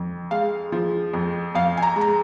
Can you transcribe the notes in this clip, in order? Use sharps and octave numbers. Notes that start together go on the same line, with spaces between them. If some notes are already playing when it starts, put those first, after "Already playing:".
Already playing: F2
G#3 F5
F3
F2
F2 F5
G#5
A#5
G#3
A#5